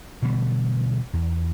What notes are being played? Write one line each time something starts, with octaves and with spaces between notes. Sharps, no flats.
B2 D3 E3 G3
E2